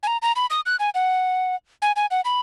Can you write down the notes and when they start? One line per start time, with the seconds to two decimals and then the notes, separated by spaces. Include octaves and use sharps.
0.03 G#5
0.07 A#5
0.22 A#5
0.36 B5
0.50 D#6
0.66 F#6
0.80 G#5
0.95 F#5
1.82 G#5
1.96 G#5
2.11 F#5
2.25 B5